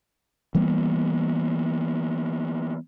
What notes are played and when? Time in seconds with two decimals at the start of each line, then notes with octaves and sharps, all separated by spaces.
0.55 E3 G3 A#3 B3